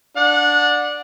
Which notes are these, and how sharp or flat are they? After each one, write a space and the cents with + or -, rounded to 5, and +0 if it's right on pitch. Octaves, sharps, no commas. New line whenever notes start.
D4 +0 F#5 -25